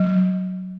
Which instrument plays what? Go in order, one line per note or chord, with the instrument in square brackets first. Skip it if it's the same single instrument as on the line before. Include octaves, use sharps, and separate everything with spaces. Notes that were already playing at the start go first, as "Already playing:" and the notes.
Already playing: [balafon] F#3